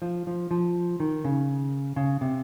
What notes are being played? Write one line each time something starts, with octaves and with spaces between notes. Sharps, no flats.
F3
F3
F3
D#3
C#3
C#3
C3